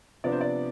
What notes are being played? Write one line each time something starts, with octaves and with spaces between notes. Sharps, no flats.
C3 F3 B3 D4 D5
C5
D5